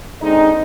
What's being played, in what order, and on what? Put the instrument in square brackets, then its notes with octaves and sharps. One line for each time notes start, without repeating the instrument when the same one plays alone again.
[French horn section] D3 G#3 C4 D#4